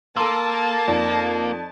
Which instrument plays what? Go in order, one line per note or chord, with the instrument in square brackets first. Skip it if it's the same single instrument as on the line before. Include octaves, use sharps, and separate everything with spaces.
[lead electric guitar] A#3 [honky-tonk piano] A4 E6 [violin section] A5 [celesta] C6 D#7
[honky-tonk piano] F2 [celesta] D#4 D5